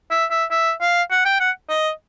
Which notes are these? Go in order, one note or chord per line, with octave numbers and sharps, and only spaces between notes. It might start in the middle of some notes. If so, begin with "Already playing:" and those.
E5
E5
E5
F5
F#5
G5
F#5
D#5